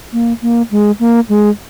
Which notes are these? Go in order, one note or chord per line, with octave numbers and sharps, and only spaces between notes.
A#3
A#3
G#3
A#3
G#3